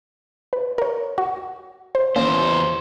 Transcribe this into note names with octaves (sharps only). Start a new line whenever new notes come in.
B4
A#4 C#5
F#4
C5
E2 C#3 A#3 C#4 C5